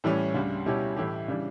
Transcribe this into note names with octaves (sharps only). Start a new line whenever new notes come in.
A2 E3 G3 C#4
D2 C#3 G3
B2 G3 C#4 E4 G4
A2 E3 A3 E4 G4
C#3 E3 G3 D4